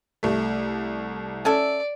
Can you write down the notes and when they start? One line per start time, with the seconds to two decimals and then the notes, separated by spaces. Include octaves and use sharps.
0.23 C2 A3
1.45 C#4 A4 D5 E5